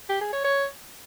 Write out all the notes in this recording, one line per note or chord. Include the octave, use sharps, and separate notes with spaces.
G4
G#4
C#5
C#5